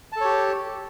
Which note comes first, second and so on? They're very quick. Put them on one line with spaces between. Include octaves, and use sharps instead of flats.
A5 A4 C#5 G4